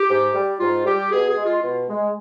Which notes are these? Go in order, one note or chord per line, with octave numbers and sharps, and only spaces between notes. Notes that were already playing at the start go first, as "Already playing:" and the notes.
Already playing: G4
G#2
G3
G#2 F4
G3 G4
B2 G#4
G#4
G#3
F4
B2 F4
G#3